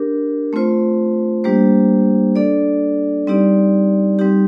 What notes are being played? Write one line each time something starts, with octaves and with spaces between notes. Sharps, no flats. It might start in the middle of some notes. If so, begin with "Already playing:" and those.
Already playing: D4 G4 A#4
A3 C4 F4 C5
G3 A#3 D4 G4 C5
D4 A4 D5
G3 C4 D#4 G4 D5
G3 C4 D#4 G4